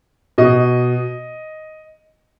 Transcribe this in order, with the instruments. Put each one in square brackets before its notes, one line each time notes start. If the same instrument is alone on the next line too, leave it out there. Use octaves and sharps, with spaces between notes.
[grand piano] B2 D#5